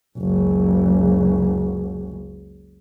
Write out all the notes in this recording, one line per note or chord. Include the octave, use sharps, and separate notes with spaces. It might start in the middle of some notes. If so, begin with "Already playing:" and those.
F#1 C#2